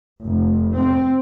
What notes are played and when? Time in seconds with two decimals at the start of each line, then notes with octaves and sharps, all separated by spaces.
0.25 F1
0.77 C4